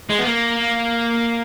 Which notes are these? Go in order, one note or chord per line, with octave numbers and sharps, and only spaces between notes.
G#3
B3
A#3